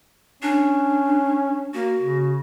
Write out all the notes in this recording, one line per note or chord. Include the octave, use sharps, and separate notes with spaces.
C#4 D4
A#3 F#4
C#3